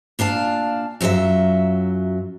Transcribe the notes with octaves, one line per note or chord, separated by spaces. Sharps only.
A#2 D4 F5 A5
F#2 F#3 F4 G4 E5